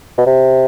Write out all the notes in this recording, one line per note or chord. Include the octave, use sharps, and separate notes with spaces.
B2
C3